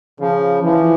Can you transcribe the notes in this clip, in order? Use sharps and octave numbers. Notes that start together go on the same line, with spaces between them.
C#3 F3
E3 F3